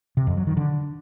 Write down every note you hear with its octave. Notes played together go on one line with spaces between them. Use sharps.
C3
F2
F#3
D#3
D3